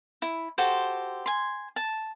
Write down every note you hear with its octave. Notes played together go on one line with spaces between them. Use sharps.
E4
F#4 G4 A4 C5
G#5 C6
A5